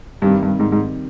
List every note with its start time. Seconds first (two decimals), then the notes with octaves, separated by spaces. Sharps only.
0.22 G2 C3 D#3 G3
0.42 G2
0.60 G#2
0.72 G#2